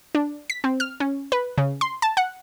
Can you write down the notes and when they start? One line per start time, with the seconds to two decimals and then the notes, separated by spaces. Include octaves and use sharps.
0.15 D4
0.50 B6
0.64 C4
0.80 F6
1.00 C#4
1.32 B4
1.58 C#3
1.81 C6
2.02 A5
2.17 F#5